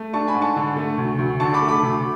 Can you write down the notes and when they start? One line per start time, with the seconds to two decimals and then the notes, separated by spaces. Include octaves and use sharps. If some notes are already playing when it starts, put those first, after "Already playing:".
Already playing: A3
0.13 D4 A5 C#6
0.27 G#5 B5
0.34 G#2
0.42 A5 C#6
0.56 D3
0.76 A3
0.98 D2
1.18 D2
1.40 D3 A5 C#6
1.54 B5 D6
1.62 A3
1.68 B5 D6
1.83 D2